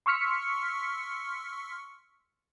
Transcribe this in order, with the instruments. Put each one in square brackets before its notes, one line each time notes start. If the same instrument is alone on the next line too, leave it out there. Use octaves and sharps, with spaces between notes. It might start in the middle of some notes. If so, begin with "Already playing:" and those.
[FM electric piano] C6 C#6 E6 F6 B6 C#7